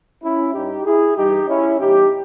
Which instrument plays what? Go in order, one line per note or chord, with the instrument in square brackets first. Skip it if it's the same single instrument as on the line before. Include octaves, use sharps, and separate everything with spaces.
[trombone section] C#4 E4
G2 G3 D#4 G4
E4 G#4
G2 E3 G3 D#4 G4
C#4 E4
E2 B2 G3 D#4 G4